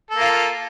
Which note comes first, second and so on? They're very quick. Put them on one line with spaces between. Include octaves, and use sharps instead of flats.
A4 A#3 F4